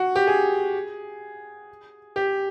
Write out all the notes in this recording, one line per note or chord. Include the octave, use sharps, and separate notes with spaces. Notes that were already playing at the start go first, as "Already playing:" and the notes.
Already playing: F#4
G4
G#4
G4